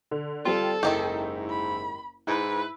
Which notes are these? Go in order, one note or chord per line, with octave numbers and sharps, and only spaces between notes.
D3
G3 C4 F4 A4
F#1 G#2 D#3 D#4 E4 G4
B5
G#2 E4 B4